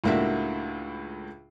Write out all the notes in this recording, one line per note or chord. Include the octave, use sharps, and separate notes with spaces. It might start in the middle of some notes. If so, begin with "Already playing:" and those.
C#2 A2 A#3 D4 F#4 E5